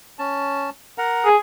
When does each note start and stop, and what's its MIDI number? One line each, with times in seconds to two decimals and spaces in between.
0.19 0.70 61
0.19 0.70 81
0.98 1.29 70
0.98 1.29 78
0.98 1.29 82
1.25 1.37 68